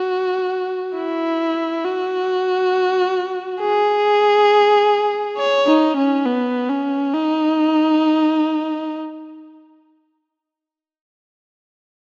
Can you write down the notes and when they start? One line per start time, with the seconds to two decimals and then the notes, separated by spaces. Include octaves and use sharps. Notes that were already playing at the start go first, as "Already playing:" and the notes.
Already playing: F#4
0.96 E4
1.85 F#4
3.61 G#4
5.38 C#5
5.67 D#4
5.96 C#4
6.26 B3
6.70 C#4
7.14 D#4